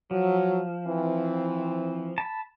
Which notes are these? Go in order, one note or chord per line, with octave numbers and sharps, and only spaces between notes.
F3 F#3
E3 C4
A5 B5